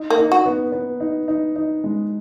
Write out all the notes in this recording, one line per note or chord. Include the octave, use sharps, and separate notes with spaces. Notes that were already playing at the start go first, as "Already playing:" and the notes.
Already playing: D#4
A#3
D#4
F#4
B3
B3
D#4
D#4
D#4
G#3